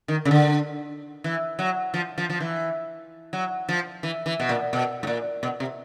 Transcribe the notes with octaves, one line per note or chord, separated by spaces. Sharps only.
D#3
C#3
D3
E3
F#3
F3
F3
F3
E3
F#3
F3
E3
E3
B2
A#2
B2
A2
A#2
B2
C3